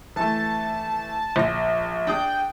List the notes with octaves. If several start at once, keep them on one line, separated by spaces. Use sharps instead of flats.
E3 A3 A5
A#1 A#6
D4 G#4 G5